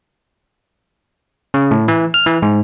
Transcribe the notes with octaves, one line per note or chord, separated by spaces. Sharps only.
C#3
A2
E3
F6
E3
G#2